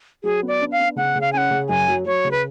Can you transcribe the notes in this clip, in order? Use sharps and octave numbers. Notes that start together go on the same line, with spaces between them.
F#3 G#4
B3
D5
D4
F5
B3
C#3 F#5
C#3
F5
C#4 F#5 G#5
C#3
F#2 G#5
F#3
F#3 C#5
C#3
B4